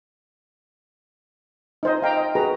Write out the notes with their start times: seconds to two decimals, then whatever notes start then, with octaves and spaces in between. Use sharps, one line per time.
1.83 D#4 C5 D#5
2.02 F5 G5 A#5
2.17 D#5
2.35 F#4 G#4 B4 A#5